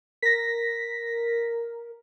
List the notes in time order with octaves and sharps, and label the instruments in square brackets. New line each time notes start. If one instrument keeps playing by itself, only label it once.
[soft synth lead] A#4 [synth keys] A#6 B6